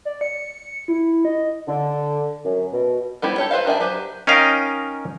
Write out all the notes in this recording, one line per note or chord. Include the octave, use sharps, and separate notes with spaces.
D5
C#7
E4
D#5
D3
F#2
B2
G3 B3 E4 G4 C5
G4 A4 C#5
B4 C5 E5 F5
D#3 D4 E5 G#5
F#3 G4 B4 C5
C#4 D#4 A#4 D#5 F5 G5